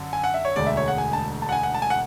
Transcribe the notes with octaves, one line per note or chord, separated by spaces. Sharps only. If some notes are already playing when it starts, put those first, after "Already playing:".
Already playing: F#2 D3
G#5
F#5
E5
C#5
E1 D2 D3 G#3 D5
E5
C#5
F#5
G#5
A5
A5
F#5
G#5
F#5
A5
G#5
F#5